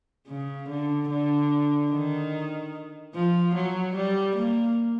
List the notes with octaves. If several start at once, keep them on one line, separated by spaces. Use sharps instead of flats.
C#3
D3
D3
D#3
F3
F#3
G3
A#3